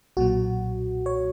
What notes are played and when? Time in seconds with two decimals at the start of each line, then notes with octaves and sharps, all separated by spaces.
0.17 B1 A#2 F#3 F#4
1.06 C#5